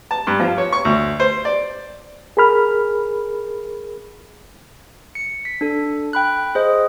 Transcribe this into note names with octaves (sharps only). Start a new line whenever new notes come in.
A5
G2
F3
C#5
C#6
D2
C5
D5
G#4 A#4 B5 F6
C#7
B6
D4 A4
G5 B5 F#6
G#4 C5 D#5